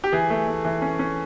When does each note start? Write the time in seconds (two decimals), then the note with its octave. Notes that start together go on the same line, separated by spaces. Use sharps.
0.04 G4
0.12 E3 G#4
0.30 A3
0.48 A3
0.65 E3
0.82 C#4
0.99 C#4